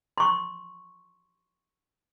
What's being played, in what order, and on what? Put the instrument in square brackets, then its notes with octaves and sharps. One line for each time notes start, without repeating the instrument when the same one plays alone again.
[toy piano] C6 C#6